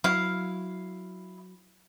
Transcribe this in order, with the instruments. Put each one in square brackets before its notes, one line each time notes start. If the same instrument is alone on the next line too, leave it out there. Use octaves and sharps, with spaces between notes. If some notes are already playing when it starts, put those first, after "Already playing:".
[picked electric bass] F#3 [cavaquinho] E4 F5